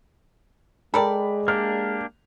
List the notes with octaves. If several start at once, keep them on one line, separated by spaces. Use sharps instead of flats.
G#3 A4 A#4 D5 G5 B5
A#3 D4 G4 F6